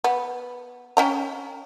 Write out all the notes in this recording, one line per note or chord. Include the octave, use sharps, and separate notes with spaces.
B3
C#4 G5 A#5